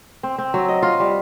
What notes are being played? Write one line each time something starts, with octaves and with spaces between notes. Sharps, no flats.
C4
C4
F#3
D#5
F4
G3